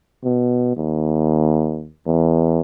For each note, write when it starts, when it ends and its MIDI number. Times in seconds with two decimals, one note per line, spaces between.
0.24 0.75 47
0.77 1.90 39
2.06 2.61 40